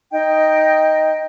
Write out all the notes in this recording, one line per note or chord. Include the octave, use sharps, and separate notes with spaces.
D#4 D#5 G5